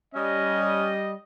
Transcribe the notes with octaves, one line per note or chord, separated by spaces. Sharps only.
G3 C#4 D#5